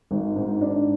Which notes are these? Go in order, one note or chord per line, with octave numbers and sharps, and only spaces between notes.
G#1
G#2
D4